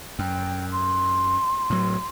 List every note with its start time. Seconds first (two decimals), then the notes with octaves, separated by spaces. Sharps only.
0.19 F#2 G5
0.72 C6
1.70 A2 F#3